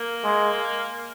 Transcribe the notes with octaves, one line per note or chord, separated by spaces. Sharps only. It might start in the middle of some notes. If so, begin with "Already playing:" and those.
Already playing: A#3
G#3